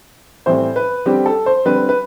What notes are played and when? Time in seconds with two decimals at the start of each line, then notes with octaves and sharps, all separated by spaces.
0.46 A2 E3 G3 C4 C5
0.76 B4
1.06 D3 G3 C4 G4
1.26 A4
1.46 C5
1.65 D3 G3 C4 B4
1.89 B4